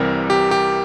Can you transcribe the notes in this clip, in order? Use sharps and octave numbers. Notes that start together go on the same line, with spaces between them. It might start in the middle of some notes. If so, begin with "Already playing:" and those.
Already playing: C2 C3 E3 G3 C4 A#4
G4
G4